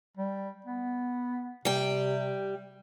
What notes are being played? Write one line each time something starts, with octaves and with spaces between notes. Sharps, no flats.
G3
B3
C3 G3 G5